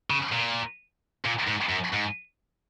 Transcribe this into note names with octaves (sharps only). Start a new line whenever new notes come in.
C#3
A#2
A#2
G#2
F#2
G#2